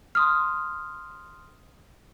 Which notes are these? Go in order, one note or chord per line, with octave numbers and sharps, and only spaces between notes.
C6 D#6 F6